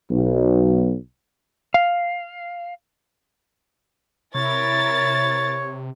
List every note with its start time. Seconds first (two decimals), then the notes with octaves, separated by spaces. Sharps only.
0.11 B1
1.74 F5
4.35 C3 E4 A#4 C#5 A6